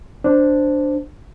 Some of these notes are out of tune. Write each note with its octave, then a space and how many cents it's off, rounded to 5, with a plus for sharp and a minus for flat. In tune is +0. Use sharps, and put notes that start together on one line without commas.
D4 +0 C5 -5